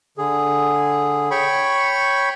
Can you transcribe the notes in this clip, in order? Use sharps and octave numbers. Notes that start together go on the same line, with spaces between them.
D3 G#4
C#5 G5 B5 C#6